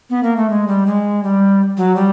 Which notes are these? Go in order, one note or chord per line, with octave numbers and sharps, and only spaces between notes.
B3
A#3
A3
G#3
G3
G#3
G3
F#3
G3